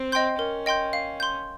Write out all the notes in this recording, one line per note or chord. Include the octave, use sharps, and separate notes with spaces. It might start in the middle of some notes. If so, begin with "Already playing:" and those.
Already playing: C4
D#5 G5 C6 G6
C#4 A#4
D#5 G5 C6 G6
F5
C6 G6